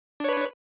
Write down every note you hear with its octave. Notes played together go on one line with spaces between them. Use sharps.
D4 B4 C#5